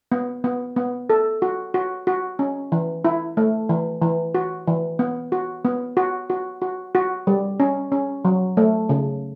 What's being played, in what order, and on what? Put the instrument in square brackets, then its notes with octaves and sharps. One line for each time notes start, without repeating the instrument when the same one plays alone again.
[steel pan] B3
B3
B3
A4
F#4
F#4
F#4
C#4
E3
E4
A3
E3
E3
F#4
E3
B3
F#4
B3
F#4
F#4
F#4
F#4
G3
C#4
C#4
F#3
A3
C#3